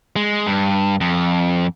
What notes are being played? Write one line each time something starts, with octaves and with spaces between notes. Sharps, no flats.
G#3
G2
F2